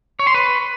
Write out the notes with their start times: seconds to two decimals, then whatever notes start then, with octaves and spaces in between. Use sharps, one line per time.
0.19 C#5
0.27 C6
0.34 B4